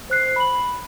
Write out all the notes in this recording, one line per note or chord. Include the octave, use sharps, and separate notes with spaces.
C5 F#6 C7
B5 F#7